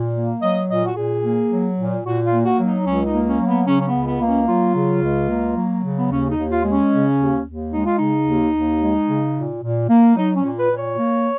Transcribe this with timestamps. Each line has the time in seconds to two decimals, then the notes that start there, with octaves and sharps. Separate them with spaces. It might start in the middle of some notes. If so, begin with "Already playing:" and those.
Already playing: A#2
0.16 A#3
0.42 F#3 D#5
0.69 A#2 D#5
0.85 F#4
0.97 A#2 G#4
1.23 A#3
1.51 F#3
1.78 A#2
2.05 A#2 F#4
2.25 F4
2.32 A#3
2.45 F#4
2.59 F#3
2.65 D#4
2.86 C#2 C#4
3.06 D#4
3.12 A#3
3.27 C#4
3.40 F#3
3.47 B3
3.67 C#3 C#4
3.81 C#4
3.88 B3
3.94 C#2
4.08 B3
4.22 A#3
4.28 C#4
4.48 F#3 F4
4.75 C#3
5.02 C#2
5.30 A#3
5.56 F#3
5.84 C#3
5.98 B3
6.11 D#2 C#4
6.31 D#4
6.38 D#2
6.51 F4
6.64 G#3
6.71 C#4
6.92 C#3
7.19 D#2
7.46 D#2
7.73 G#3 D#4
7.85 F4
7.98 C#3 D#4
8.26 D#2
8.54 D#2
8.81 G#3
9.08 C#3
9.35 A#2
9.62 A#2
9.89 A#3
10.16 F#3 D#4
10.36 C#4
10.43 A#2
10.57 B4
10.71 A#2
10.77 C#5
10.98 A#3